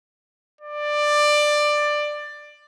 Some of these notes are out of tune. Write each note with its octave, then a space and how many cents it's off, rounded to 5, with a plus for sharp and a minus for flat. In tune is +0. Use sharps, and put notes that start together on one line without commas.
D5 +15